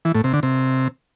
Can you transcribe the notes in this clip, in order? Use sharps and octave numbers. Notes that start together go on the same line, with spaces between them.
E3
A2
C3
D3
C3